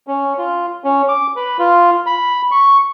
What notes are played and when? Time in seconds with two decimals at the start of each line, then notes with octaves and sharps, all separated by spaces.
0.07 C#4
0.38 F4
0.84 C#4
1.09 D6
1.36 B4
1.59 F4
2.06 B5
2.51 C#6